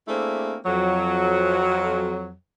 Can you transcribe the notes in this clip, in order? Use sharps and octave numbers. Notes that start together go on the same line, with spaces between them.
A3 A#3 C4 D4 E4 G#4
F2 F#3